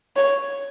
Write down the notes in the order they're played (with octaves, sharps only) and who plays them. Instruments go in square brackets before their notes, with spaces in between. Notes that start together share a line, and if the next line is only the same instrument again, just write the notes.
[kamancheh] C#5